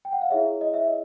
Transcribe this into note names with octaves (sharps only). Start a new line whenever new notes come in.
G5
F#5
F5
E4 G#4 C#5 E5
D#5
E5
D#5